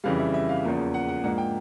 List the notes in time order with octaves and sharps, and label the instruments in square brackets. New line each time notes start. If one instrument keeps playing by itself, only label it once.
[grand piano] F2 C#3 E3 G3 F5
E5
E5
F5
E2 C#3 F3 A#3
F#5
F#5
G#2 F3 A#3 D4 F#5
G5